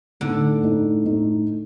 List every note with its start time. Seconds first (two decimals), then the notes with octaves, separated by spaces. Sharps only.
0.20 A2 D3 A3 D#4
0.63 A2 A3 D#4
1.04 A2 A3 D#4